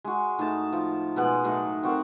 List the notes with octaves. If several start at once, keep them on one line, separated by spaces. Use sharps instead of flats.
G#3 F#4
A2 D#4 A5
F3
B2 G#3 F#5
A2 F#3 D#4 A4
C4 F#4 A#4